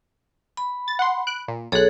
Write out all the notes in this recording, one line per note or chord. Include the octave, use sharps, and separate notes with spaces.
B5
A6
F#5 C6
F#6 D7
A#2
B1 G#4 A4 C#5 F#6